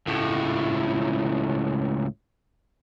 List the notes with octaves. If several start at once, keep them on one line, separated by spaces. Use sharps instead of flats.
C#2 A2